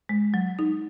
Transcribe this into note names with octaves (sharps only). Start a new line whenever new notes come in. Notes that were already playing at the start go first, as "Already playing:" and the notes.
G#3
F#3
D#4